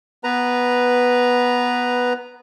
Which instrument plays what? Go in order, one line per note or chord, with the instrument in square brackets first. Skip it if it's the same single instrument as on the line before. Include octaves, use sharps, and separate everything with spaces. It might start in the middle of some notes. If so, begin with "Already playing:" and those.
[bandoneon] B3 B4 A#5